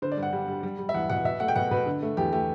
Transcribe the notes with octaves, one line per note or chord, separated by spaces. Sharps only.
D3 C5
D5
G2
F#5
G3
G3
G3
G3
E5
E2 F#5
B2 F#5
B2 E5
A3 F#5
G5
B2 F#5
B2 B4
D3
A3
E2 G4
A3 G4